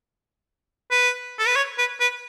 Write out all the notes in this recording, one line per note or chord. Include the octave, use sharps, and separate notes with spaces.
B4
A4
B4
C#5
B4
B4